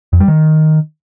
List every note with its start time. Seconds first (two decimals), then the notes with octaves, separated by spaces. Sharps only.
0.13 F2
0.20 G3
0.28 D#3